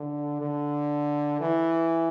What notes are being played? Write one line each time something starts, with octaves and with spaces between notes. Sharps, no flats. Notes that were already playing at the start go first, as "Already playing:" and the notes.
Already playing: D3
D3
E3